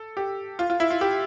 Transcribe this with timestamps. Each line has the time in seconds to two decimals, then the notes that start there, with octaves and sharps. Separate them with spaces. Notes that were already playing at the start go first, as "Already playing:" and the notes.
Already playing: A4
0.17 G4
0.59 F4
0.70 F4
0.80 E4
0.90 F4
1.01 G4